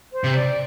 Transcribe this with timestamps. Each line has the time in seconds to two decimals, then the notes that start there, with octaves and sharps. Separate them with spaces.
0.13 C5
0.24 C3
0.34 D5